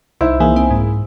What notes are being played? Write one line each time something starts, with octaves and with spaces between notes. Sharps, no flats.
C2 D#4 E4 C5 E5
E3 A#3 G#4
C4
G#2